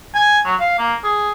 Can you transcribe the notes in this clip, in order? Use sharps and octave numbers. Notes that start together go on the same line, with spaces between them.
G#5
F#3
F5
A#3
G#4